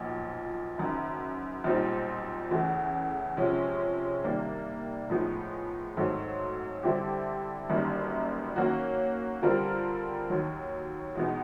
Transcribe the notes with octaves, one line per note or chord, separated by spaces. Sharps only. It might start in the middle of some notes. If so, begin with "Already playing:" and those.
Already playing: B1 A#2 F3
F#1 F#2 D#3
B1 A#2 G3 C4 D#4
E2 C#3 E3 A3
C3 F3 G#3 C#4
C3 D#3 G3 A#3 D4
A2 F3 G#3 B3 D#4
G#2 D#3 F#3 A3 C4
D3 G3 C4 E4 G4
G1 F#2 D#3 G3 A#3
D#3 F#3 A#3 C#4 F#4
D3 G3 C4 F4 A#4
D#2 D#3 F#3
E2 B2 G#3 B3 D#4